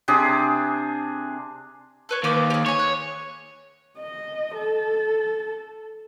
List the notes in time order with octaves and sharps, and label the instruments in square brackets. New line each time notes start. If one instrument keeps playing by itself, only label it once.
[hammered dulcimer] C3 D4 G#4
[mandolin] A4 B4 C#5
[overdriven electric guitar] D#2 [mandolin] B4 C5 D6
[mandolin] G4 G#4
[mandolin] G#4 G#5 [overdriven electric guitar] C#5
[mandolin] F#6
[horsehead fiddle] D#5
A4